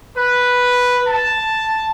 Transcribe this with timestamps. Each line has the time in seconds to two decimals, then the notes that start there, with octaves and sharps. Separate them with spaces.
0.16 B4
1.07 A5